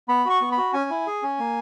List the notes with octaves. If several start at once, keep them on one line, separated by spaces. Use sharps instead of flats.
B3 B5
F#4 C#6
B3
B5
F#4
C#4 G#5
E4
G#4
C#4
A#3